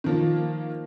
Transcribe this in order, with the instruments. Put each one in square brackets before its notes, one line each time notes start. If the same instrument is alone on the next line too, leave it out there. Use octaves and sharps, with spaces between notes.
[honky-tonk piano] D#3 F3 A#3